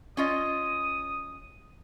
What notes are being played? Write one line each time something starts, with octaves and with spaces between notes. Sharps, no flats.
C#4 F4 D#5 D#6